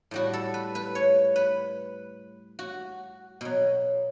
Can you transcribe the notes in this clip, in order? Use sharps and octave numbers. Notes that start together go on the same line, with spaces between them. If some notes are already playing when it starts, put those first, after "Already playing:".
A2 G3 F#4
A4
B4
B4
C#5
B4
F#4
B2 F#3